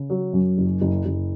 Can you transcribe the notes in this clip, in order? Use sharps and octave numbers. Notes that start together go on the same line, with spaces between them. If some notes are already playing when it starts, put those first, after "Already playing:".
Already playing: C#3
F#3
F#2
F#1
F#1
F#1